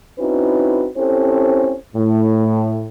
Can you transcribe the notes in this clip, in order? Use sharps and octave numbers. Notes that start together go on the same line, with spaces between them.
C4 C#4 D#4 E4 F#4 B4
C4 C#4 E4 G4 A4 C5
A2